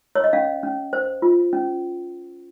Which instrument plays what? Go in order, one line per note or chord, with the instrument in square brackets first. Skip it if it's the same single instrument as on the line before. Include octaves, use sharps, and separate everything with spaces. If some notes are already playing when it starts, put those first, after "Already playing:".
[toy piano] C#5
D#5
C#4 F5
C#4
C5
F4
C#4